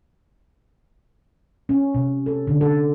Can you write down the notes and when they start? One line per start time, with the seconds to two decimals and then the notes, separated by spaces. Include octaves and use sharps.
1.69 C#4
1.95 C3
2.26 A4
2.47 D3
2.61 A4